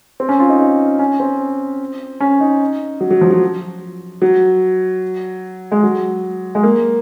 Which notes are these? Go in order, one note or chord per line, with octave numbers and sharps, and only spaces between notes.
C4
C#4
F4
D#4
D#4
C#4
C4
C#4
D#4
F#3
F#3
F3
F#3
F#3
G#3
F#3
G#3
A#3